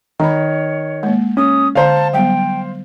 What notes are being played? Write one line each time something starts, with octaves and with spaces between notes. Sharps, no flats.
D#3 C#5 A#5 B5
G#3 A#3
C#4 D#6
D3 C5 D5 F5 A5 A#5
F#3 G3 B3 G5